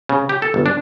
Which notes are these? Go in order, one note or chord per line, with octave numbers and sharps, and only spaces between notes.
C#3
G4
A4
G1
D4